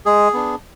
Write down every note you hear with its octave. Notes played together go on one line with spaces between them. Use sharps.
G#3 G#4
B3 D4